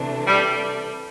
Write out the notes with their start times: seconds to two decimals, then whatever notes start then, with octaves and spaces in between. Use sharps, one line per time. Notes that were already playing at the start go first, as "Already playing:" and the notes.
Already playing: C3 E3 A3 D4
0.27 G3